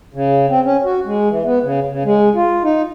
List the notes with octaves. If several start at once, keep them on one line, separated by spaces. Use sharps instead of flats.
C#3
C4
C#4
F#4
G#3
E3
B3
C#3
C#3
G#3
F4
D#4